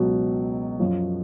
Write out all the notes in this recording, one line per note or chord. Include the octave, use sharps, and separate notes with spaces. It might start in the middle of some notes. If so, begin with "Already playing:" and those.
Already playing: C#2 B2 F#3
F#2 F3